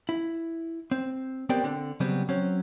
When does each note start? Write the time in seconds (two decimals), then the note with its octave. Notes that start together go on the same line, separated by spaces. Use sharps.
0.09 E4
0.91 C4
1.49 B3 C4 G4 A#4 D5 G5
1.63 D3 C4 D4
2.00 C#3 F#3 G3 B3 C4
2.29 F#3 C4 C#4